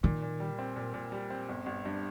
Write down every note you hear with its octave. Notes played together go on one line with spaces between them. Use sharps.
A#2 D#3
A#2
G3
C4
A#2
A#2
G3
C4
G1
G1
G2